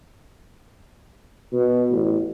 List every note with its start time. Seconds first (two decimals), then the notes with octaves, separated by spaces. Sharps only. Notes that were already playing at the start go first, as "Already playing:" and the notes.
1.53 B2
1.91 A1